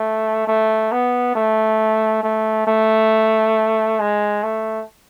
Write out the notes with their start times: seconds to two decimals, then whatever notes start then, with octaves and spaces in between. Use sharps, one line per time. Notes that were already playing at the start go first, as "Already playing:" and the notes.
Already playing: A3
0.47 A3
0.92 B3
1.35 A3
2.23 A3
2.67 A3
4.00 G#3
4.43 A3